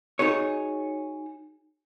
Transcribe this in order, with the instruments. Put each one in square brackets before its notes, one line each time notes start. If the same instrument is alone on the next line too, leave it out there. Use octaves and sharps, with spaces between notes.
[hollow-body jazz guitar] D#4 F#4 G#4 C#5